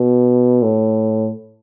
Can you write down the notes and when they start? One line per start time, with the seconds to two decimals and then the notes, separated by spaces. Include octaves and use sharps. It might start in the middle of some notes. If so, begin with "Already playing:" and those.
Already playing: B2
0.63 A2